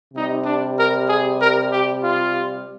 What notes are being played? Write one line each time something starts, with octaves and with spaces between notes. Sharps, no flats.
C3 G3 D#4
D4
A#4
G#4
A#4
G4
F4